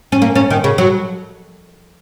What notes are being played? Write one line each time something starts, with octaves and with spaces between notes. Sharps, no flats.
C#4
A#3
C#4
D#3
C#3
F#3